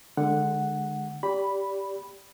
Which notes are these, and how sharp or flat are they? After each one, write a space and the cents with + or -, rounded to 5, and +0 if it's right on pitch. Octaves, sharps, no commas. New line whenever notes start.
D3 +20 G#3 +0 F#5 +0
G4 +0 D5 -20 B5 +0